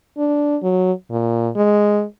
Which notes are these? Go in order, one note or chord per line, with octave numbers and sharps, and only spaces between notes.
D4
F#3
A#2
G#3